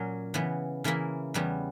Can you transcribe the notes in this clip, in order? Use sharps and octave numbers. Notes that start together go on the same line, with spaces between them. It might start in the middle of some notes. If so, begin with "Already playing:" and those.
Already playing: A#2 F#3 C#4
C#3 E3 B3
C#3 E3 A#3 E4
E2 C#3 G3 B3